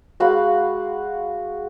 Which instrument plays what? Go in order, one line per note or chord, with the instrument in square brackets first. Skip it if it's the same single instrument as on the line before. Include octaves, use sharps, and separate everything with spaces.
[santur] G#3 F#4 F5 B5